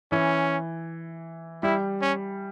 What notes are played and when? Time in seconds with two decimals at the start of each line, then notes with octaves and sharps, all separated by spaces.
0.12 E3 C#4
1.63 G3 E4
2.01 C#4